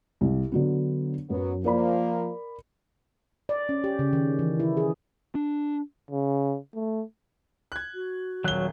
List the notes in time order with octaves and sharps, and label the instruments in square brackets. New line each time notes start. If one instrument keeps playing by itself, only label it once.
[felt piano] C2
D3 F#3 B3
[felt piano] F#2 [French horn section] F#3 B3
[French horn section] F3 A#3 [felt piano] A#4 D5 B5
[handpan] D5
C#4
G4
C#3
D#3
E3
E4
G#4
[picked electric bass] D4
[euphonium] C#3
A3
[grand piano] F#6 G#6
[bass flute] F#4
[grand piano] D#1 G7 [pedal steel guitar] F#3 C#5 F#6